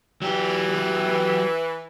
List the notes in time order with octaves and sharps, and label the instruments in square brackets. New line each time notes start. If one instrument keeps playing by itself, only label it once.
[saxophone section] E3 [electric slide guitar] F#3 G4